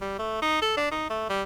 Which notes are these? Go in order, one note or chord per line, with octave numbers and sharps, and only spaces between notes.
G3
A3
D#4
A4
D4
D#4
A3
G3